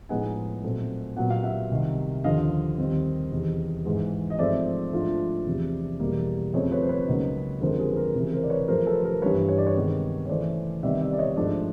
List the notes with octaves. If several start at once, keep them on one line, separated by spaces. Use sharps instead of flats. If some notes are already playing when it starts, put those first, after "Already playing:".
A2 F3 G#3 B3 D#4 F#5 G#5
A#2 F#3 A3 C4
A#2 F#3 B3 F#5
F5
E5 F#5
C2 C3 D#3
D#2 D3 F3 D#5 F5
D#2 D#3 G3 C4
E2 C3 D#3
G#2 E3 G#3
D#5
G#2 F3 A3 C4 D5 E5
G#2 F3 A3 D4 F4
E2 C3 F3
E2 B2 G3 A#3
F2 C#3 F3 A3 C4 C#5 D#5
B4 C#5
C5
B4 C#5
C#2 C#3 F#3 A#3 D#4
F2 D3 F3 G#3 A#4 C5
G#4 A#4
B4
A#4 C5
C#2 C3 E3
A#4 C5
D5
B4 C#5
F#2 C#3 F3 A3 A#4 C5
A4 B4
A#4 C5
G2 E3 G3 B4 C#5
C#5
D5
B4 C#5
C3 D#3 G#3 B3
C#5
C#3 E3 A3 C#4 C5 D5
C2 C3 D#3 G3 B3 D5 E5
D5 E5
D5
C#5 D#5
G#2 F3 A3 D4 C5 D5